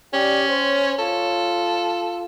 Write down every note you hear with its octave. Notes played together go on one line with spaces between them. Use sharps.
C#4 G4 D5
C5 C#5
F4 A4